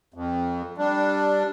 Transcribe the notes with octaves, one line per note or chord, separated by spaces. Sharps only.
F2
G3 D4